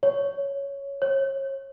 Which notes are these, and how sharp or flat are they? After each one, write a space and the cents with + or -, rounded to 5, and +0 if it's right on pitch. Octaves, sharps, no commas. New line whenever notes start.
C#5 +5
C#5 -35